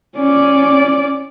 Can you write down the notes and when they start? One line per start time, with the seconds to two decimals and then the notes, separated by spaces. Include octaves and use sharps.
0.16 C#4 D5